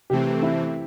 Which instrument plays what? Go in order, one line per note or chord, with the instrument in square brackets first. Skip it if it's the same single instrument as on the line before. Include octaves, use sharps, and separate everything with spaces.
[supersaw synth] C3 E3 A3 C4 [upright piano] G4
[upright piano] E4